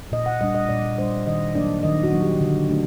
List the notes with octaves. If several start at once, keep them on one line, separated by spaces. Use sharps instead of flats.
A#2 D#5
F#5
G3 D4 D#5
D#5
A#2 D5
G3 D4 C5
D#3 D#5
F#3 A#3 D4 D5
D#3 D#5
F#4
F#3 A#3 D4
G4
D3 F#4
A3 D4 F#4